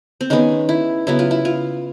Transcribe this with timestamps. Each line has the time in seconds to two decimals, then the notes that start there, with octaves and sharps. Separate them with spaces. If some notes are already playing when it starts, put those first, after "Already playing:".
0.21 C4
0.30 D#3 G#3 B3 C#4
0.69 E4
1.07 C#3 F#3 B3 E4
1.19 F4
1.31 E4
1.45 F4